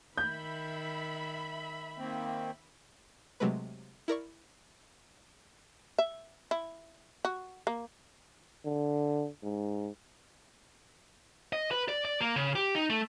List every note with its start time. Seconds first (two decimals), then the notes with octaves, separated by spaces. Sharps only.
0.18 D#3 E5 B5 G6
1.98 D#3 A#3 C4
3.40 C3 F#3 G#3 A3 B4
4.08 E4 A#4 D5 C#6
5.98 E5
6.51 E4
7.25 F#4
7.67 A#3
8.65 D3
9.43 G#2
11.53 D#5
11.71 B4
11.88 D5
12.05 D5
12.21 A#3
12.36 C#3
12.55 G4
12.75 D#4
12.90 A3